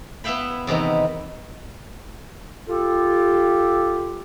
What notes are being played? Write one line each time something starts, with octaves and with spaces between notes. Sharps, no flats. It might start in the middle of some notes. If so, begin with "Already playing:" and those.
B3 E4 E5 F5 G5 B5
E2 C3 D#3 B3 D#4
F4 G4 A4